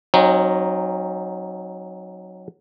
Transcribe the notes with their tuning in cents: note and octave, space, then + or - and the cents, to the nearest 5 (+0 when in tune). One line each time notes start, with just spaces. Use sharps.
F#3 +0 C4 +45 D#4 +0